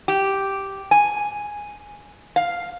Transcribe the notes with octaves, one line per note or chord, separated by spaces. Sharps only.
G4
G#5
F5